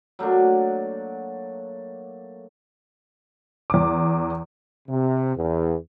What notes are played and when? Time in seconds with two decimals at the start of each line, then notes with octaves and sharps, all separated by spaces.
0.19 F#3 A3 A#3 D4
3.70 E2 D6
4.89 C3
5.36 E2